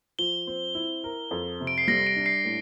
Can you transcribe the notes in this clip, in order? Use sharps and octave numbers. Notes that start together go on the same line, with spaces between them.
F3 G7
C4
E4
A#4
F2
C3
D7
C7
G3 A#6
D7
D4
C7
A2